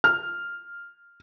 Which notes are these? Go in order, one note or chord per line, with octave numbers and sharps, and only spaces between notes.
F6